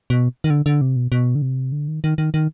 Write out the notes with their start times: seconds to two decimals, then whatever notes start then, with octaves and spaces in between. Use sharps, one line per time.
0.10 B2
0.44 D#3
0.50 D3
0.66 D3
0.81 C3
0.96 B2
1.12 B2
1.35 D3
1.42 C3
1.72 D3
1.88 D#3
2.04 D#3
2.18 D#3
2.34 D#3